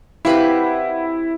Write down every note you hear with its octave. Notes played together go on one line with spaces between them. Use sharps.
C4 E4 F#4 G4 B4 F5 B5